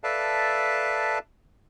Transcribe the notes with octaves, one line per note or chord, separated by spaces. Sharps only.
A4 B4 D5 E5 F5 A5